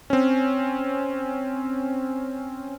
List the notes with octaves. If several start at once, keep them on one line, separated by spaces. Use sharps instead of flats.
C4 C#4